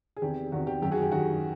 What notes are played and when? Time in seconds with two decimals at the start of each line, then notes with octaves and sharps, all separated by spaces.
0.17 G#4
0.22 E2 C3 D#3 G4
0.52 E2 C3 D#3 F#4
0.67 G4
0.82 F#2 D#3 G4
0.92 F#4 G#4
1.01 G4
1.12 F#2 D#3 F#4